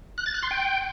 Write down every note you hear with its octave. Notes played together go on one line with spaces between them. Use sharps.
F#6
A6
F#6
C6
G5